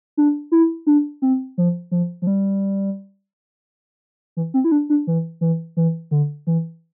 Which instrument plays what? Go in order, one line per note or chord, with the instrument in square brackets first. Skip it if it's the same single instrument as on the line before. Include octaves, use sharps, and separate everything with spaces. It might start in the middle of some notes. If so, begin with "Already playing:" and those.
[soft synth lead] D4
E4
D4
C4
F3
F3
F3
G3
E3
C4
E4
D4
D4
E3
E3
E3
D3
E3